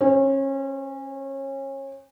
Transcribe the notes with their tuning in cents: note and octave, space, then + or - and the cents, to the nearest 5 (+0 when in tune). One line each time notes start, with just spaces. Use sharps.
C#4 -30 C5 +0